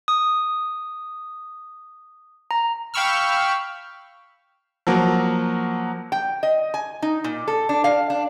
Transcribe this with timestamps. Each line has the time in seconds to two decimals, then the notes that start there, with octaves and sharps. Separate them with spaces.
0.08 D#6
2.51 A#5
2.94 F5 G5 B5 C#6 E6 F6
4.87 F3 F#3 A#3
6.12 G5
6.43 D#5
6.74 G#5
7.02 D#4
7.24 A#2
7.48 A4
7.69 D4
7.84 F5
8.10 D4